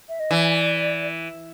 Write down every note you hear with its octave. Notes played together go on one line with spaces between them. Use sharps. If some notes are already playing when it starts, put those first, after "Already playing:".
E5
D#5
E3 D5